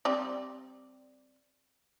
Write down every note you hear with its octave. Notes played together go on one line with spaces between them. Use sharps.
G3 C4 D5